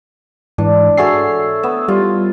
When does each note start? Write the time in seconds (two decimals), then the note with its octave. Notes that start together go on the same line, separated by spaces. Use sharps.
0.58 G#2 E3 D4
0.97 F#4 G#4 A4 C#5 E5 C7
1.63 B3 E6
1.88 G3 F4